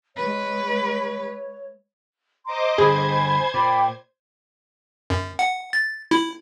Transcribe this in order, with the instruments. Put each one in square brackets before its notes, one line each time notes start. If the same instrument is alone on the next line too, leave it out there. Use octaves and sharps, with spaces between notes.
[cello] G#3 B4 [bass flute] C#5
[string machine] C5 D#5 D6 [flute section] A#5 C6
[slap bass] G2 D3 [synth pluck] G#4 [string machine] C5 G#6 [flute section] G#5 B5
[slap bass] A#2 [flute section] G5 B5 D6
[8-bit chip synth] F#2
F#5
A6
E4